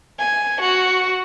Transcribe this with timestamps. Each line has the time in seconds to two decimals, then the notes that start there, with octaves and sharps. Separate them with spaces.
0.18 G#5
0.60 F#4